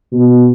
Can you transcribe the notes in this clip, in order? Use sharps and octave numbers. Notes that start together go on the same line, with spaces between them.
B2